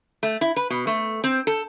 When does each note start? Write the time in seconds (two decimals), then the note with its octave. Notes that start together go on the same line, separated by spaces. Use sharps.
0.23 A3
0.41 E4
0.56 B4
0.70 B2
0.87 A3
1.24 C4
1.47 A4